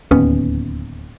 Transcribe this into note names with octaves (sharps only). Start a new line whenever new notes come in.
D1 D#2 B3 C#4